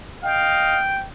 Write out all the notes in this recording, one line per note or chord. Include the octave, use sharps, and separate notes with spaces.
D#5 F5 G5